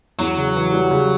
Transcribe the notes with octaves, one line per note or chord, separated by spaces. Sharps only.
E2 F#3
C#3
E3
G3
C#3